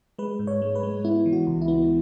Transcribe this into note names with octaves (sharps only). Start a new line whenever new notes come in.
G#3 B4
G#2
C#5
G#3
B4
G#3
B3 E4
E3
F#4
C#2
E4
B3